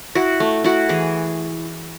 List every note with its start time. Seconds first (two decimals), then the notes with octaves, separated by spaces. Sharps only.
0.15 E4 F#4
0.40 A3
0.64 E4 F#4
0.89 E3 G#4